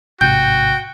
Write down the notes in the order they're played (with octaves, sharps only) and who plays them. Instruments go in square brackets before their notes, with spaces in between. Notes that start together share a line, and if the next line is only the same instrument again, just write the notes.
[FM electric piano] A1 G#2 C3 [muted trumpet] F#4 [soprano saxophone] G5 [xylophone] G6